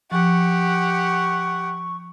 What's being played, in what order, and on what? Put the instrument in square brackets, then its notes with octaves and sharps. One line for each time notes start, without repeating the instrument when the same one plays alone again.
[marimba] F3 [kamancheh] G4 F#5 [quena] C#6